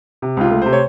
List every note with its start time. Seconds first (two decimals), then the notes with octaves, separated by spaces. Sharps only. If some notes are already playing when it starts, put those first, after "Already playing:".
0.22 C3
0.37 C#2 F4
0.51 A3
0.62 C3 C5
0.73 C#5